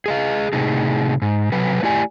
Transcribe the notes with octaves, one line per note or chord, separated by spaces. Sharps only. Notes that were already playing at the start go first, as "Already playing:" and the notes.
G#4 D#5 F5
A2 C3 D#4 G#4
G#2
C3 F#3 B4
A3 E4 G4 D5 G#5